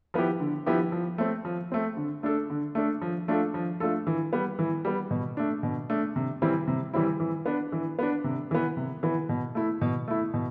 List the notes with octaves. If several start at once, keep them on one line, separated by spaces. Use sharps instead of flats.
F3 B3 E4 G4
D3
F3 B3 E4 G4
F3
A3 C4
F3
A3 C4
D3
A3 D4 A4
D3
A3 D4 A4
F3
A3 D4 F4 A4
F3
A3 D4 F4 A4
E3
G3 B3
E3
G3 B3
B2
A3 D4
B2
A3 D4
C3
E3 G3 C4 E4
C3
E3 G3 C4 E4
E3
B3 D4
E3
B3 D4
C3
E3 B3
C3
E3 B3
B2
A3 E4
B2
A3 E4
B2